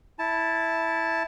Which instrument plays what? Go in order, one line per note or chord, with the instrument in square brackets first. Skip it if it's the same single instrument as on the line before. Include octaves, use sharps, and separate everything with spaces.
[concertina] E4 A5